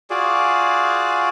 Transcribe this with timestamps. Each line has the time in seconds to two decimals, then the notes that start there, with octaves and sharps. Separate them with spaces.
0.10 F4 F#4 G#4 D5